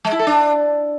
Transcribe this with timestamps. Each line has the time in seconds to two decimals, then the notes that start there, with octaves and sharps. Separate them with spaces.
0.05 G#3
0.12 E4
0.19 A4
0.27 D4